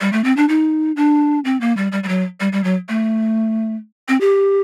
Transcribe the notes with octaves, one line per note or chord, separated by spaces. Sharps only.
G3
A3
C4
D4
D#4
D4
C4
A#3
G3
G3
G3
F#3
G3
G3
F#3
A3
C4
G4